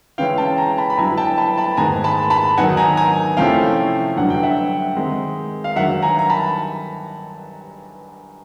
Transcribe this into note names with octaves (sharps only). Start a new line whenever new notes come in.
C#3 E3 G#3 C#4 E4 F5 G5
G5 A5
G#5 A#5
A5 B5
B5
G2 D3 F#3 B3 E4 G#5 A#5
G5 A5
A5 B5
A5 B5
G#2 D#3 G#3 B3 G#5 A#5
A5 B5
A5 B5
D#3 F#3 B3 D#4 F#5 G#5
G#5 A#5
G#5 A#5
C3 F3 A3 C#4 E4 F5 G5
G2 D3 F#3 F#5
G5
E5 F#5
D#3 G#3 C4 D#4
F5
G2 D#3 F#3 E5 F#5
G#5 A#5
A#5
A5 B5